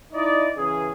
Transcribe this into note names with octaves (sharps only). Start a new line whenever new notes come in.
D#4 E4 D5 D#5
C#3 E3 B3 C#4 G#4